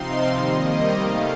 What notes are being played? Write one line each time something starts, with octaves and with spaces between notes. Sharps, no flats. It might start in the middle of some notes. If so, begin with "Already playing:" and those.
Already playing: C3 F3 C4 D#4 F5 C6
D#3 G3 A#3 D#5
C3 D#3 A3 F5